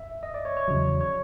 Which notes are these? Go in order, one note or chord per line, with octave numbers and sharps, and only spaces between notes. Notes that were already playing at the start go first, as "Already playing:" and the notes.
Already playing: E5
D#5
D5
C#5
C#5
E2 C#3 F#3
C#5